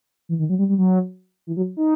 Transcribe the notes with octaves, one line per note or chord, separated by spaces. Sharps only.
E3
D#3
F#3
G3
G3
F#3
E3
F#3
D#4